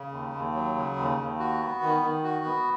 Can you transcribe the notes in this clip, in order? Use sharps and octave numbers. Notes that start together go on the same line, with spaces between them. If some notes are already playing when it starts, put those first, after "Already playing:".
Already playing: C#3
D#2
D#2
F#3
C#3
D#2
D#2
F#4
B3
D#3
D#3
F#4
B3